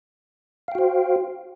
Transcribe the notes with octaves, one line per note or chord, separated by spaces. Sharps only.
F#4 C5 F5 G5